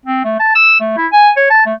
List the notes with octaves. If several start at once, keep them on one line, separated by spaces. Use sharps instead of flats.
C4
A3
A5
E6
A3
E4
G#5
C#5
A5
A3